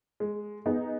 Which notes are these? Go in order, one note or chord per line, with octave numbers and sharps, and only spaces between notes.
G#3
B3 D#4 G#4